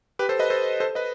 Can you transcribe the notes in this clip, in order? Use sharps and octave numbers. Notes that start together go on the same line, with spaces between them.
G4 B4
A4 C5
B4 D#5
A4 C5
A4 C5
B4 D#5